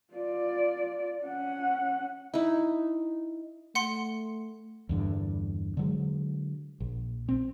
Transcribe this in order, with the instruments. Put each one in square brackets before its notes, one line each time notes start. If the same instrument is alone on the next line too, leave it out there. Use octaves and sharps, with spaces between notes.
[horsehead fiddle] F4 D5
C#4 F#5
[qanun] D#4 E4
[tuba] A3 [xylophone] F#5 C6 C#7
[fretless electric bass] E2 G2 D3
D3 F#3 G#3
A#1
C4